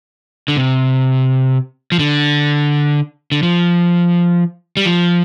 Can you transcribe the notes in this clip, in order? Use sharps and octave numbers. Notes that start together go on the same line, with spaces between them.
D3
C3
F3
D3
D3
F3
G3
F3